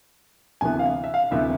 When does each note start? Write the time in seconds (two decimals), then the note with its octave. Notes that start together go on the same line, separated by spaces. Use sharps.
0.61 D2 C3 E3 B3 G#5
0.79 F5
1.04 E5
1.14 F5
1.31 D2 C3 E3 B3 E5